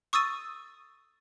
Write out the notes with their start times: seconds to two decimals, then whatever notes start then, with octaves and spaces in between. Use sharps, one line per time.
0.13 C#6 D#6 E6 A6 D#7